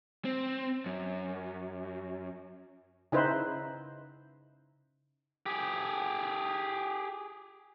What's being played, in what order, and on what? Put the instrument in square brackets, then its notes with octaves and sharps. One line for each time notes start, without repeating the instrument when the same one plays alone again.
[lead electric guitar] C4
F#2
[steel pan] C#3 D#4 E4 B4 C5
[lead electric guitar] G4 G#4